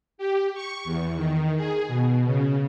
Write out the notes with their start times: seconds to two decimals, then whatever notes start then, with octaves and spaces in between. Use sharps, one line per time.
0.18 G4
0.54 C#6
0.85 E2
1.16 D#3
1.56 G#4
1.88 B2
2.25 C#3